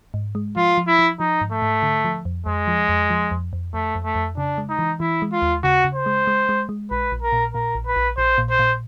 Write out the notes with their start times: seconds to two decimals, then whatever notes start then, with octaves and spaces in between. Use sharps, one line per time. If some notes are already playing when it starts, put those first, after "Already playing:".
0.14 G#2
0.35 G#3
0.56 F3 F4
0.78 F3
0.87 E4
0.99 F3
1.20 F3 D#4
1.41 G#2
1.52 A3
1.62 G#2
1.83 D3
2.05 F3
2.25 F2
2.46 F2 G#3
2.68 F3
2.89 F2
3.10 F3
3.31 F2
3.53 F2
3.74 F2 A3
3.95 F2
4.05 A3
4.15 F2
4.37 C#3 D4
4.58 G#3
4.69 D#4
4.79 E3
5.00 E3 E4
5.22 G#3
5.32 F4
5.42 D#2
5.64 C#3 F#4
5.85 C#3
5.95 C5
6.06 G#3
6.27 G#3
6.49 G#3
6.69 G#3
6.90 A#1 B4
7.12 A#1
7.22 A#4
7.33 A#2
7.53 A#2 A#4
7.75 A#1
7.86 B4
7.96 A#1
8.17 A#1 C5
8.38 A#2
8.50 C5
8.59 A#2